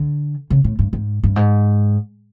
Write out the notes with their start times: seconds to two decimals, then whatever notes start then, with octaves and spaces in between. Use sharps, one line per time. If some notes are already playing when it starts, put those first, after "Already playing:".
Already playing: D3
0.50 C#3
0.64 A2
0.79 G2
0.93 G#2
1.24 G2
1.36 G#2